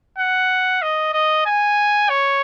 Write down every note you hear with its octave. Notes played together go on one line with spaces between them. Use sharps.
F#5
D#5
D#5
G#5
C#5